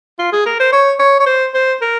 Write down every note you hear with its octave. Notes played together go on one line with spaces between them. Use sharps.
F4
G#4
A#4
C5
C#5
C#5
C#5
C5
C5
A#4